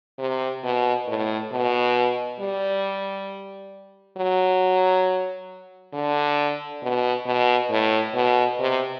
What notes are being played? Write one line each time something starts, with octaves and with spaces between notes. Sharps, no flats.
C3
B2
A2
B2
G3
F#3
D3
B2
B2
A2
B2
C3